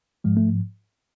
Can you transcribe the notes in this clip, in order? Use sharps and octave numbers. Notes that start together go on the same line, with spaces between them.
G#2 F3 G#3
A3